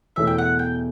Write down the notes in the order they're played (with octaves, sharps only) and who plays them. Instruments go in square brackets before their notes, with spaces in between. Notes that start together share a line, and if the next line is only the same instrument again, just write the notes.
[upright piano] E2 B2 A3 C#4 E4 [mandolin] E5
[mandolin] G5
F#5
G5